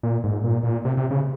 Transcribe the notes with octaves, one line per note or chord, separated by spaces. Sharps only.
A#2
G#2
A#2
A#2
C3
C3
C#3